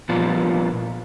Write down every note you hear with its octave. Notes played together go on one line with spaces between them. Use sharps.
A#2 F3 G3 B3 F4